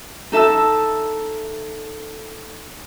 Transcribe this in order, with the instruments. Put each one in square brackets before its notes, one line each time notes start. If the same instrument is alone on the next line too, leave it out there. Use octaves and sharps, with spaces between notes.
[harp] D#4 A4 E5 A5 E6